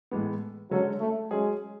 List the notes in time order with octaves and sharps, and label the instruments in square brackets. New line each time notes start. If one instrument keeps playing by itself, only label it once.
[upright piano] A2 E3 G#3 B3
[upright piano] D3 G#3 C#4 F#4 A4 [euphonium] F#3
[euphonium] A3
[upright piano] F#3 C#4 G#4 [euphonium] G#3